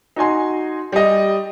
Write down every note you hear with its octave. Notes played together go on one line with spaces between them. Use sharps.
D#4 F#4 G#5 C6
G3 D#5